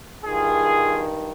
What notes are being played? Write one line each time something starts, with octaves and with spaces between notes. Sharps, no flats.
G2 D#3 F4 G#4